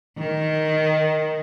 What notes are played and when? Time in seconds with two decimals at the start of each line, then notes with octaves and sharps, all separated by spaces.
0.18 D#3